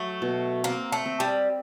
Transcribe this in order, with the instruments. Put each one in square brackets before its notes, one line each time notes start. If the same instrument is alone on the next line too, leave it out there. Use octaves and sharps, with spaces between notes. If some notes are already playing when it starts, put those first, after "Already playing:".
Already playing: [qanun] F#3 [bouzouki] A3
[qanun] B2
[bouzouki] A#3 [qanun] C4
[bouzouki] A3
[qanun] C4
[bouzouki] G3